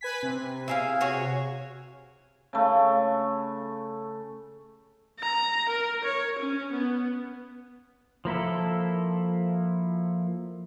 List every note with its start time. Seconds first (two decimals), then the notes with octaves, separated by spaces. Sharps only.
0.01 B4 G#5 B6
0.23 C3
0.68 E4 G#4 F5
1.01 F#4 G#4 C#5
2.53 C#3 A3
5.19 A#5
5.69 A#4
6.04 C#5
6.39 C#4
6.72 B3
8.25 F3 A#3 E4 A4